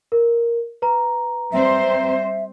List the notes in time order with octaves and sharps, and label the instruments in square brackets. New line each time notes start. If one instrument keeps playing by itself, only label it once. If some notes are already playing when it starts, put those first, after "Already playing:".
[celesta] A#4
B4 A#5
[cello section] G3 C4 C5 [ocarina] E5